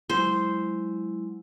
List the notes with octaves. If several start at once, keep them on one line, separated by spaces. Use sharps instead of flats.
F#3 G#3 E4 C5